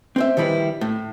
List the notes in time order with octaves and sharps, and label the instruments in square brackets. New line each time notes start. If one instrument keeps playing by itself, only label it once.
[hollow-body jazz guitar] C4 C5 E5
D#3 F3 G3 E4 B4
A2